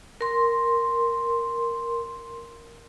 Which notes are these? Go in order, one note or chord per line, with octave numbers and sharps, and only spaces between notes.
A#4 C6